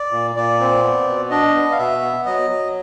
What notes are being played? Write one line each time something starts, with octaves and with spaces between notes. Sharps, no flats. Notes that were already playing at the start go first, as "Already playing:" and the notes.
Already playing: D5
A#2
A#2 D5
C4
B3
B2
D4 D#5
B3
F5
B2 E5
B3
F#3 D#5
F#3